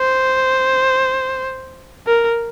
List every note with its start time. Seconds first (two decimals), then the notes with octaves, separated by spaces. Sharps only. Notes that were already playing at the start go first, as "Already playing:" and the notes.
Already playing: C5
2.07 A#4